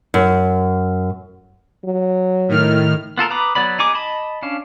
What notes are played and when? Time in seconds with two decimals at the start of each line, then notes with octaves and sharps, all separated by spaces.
0.14 F#2
1.85 F#3
2.48 A2 D#3 F6
3.18 B3 F4 A4 A#4
3.30 B4 A#5 B5 D6 D#6
3.55 F#3 B3 D5 B5
3.79 D#4 G#4 D6
3.94 D#5 A5 B5
4.42 C#4 D4 F5